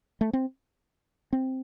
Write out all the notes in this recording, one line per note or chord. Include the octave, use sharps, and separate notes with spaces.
A3
C4
C4